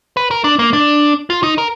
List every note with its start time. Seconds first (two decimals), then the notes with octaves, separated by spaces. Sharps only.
0.17 B4
0.31 A#4
0.44 D4
0.59 A#3
0.73 D4
1.30 F4
1.43 D#4
1.58 A#4